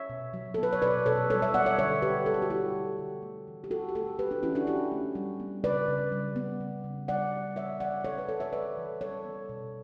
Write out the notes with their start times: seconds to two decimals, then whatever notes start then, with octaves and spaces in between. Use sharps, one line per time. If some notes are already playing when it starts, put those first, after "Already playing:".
Already playing: C#5 E5
0.10 B2
0.33 F#3
0.54 B3 A4
0.63 B4
0.73 C#5
0.82 B2 B4 D5
1.06 B2 A4 C#5
1.30 G3 A4 C#5
1.42 C#5 E5
1.54 B3 D5 F#5
1.66 C#5 E5
1.79 D3 C#5 E5
2.02 D3 G4 B4
2.26 G3 A4
2.34 G4
2.42 F#4
2.50 B3 E4 G4
2.75 D3
2.99 D3
3.23 A3
3.47 E3
3.64 G4
3.71 E3 F#4 A4
3.88 G4
3.95 A3 F#4 A4
4.19 A3 G4 B4
4.31 D4 F#4
4.43 E3 C#4 E4
4.55 D4 F#4
4.67 E3 E4 G4
4.92 A3
5.15 G3
5.40 B3
5.64 C#3 B4 D5
5.88 C#3
6.12 G3
6.36 B3
6.61 C#3
6.84 C#3
7.08 G3 D5 F#5
7.32 B3
7.56 E3 C#5 E5
7.80 E3 D5 F#5
8.04 G3 A4 C#5
8.18 B4
8.28 B3 A4 C#5
8.40 C#5 E5
8.53 E3 B4 D5
8.77 E3
9.01 G3 A4 C#5
9.25 B3
9.49 B2